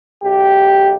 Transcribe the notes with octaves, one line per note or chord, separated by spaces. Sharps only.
B1 G4